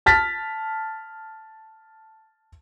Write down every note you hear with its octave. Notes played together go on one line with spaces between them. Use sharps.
A5 F6 A6 B6